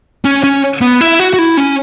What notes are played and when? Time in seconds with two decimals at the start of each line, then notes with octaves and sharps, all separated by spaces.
0.25 C#4
0.44 C#4
0.81 B3
1.01 E4
1.20 F#4
1.34 F#4
1.39 E4
1.57 C#4